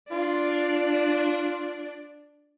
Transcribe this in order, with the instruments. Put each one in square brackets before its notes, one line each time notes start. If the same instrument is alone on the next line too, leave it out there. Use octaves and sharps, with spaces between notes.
[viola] D4 D5 [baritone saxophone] F4